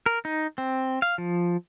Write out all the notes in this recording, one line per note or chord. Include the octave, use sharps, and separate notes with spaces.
A#4
D#4
C4
F5
F3